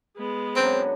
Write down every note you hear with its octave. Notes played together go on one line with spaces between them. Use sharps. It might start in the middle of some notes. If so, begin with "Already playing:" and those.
G#3 B3
F#2 D3 F#3 C4